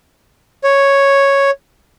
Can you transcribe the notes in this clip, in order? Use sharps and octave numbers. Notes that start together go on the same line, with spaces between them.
C#5